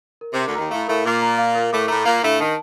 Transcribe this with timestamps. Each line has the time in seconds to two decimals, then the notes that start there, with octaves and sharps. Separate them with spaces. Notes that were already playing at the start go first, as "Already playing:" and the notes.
0.21 A#4
0.33 C3 D6
0.46 D2 D3
0.55 D#2 D#3 A#5
0.71 A2 A3 F5
0.88 A2 A3 A#4
1.05 A#2 A#3 D6
1.22 A#5
1.38 F5
1.55 A#4
1.72 A2 A3 D6
1.89 A2 A3 A#5
2.06 A#2 A#3 F5
2.22 A2 A3 D4
2.40 D#3 A5